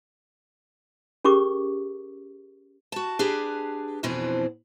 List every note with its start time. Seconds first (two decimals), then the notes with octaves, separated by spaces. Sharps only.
1.24 C#4 G4 G#4 A#4 C#6 D6
2.92 F#4 A5
3.19 D4 G4 G#4 B4
4.03 F2 B2 E3 F3 C4 D4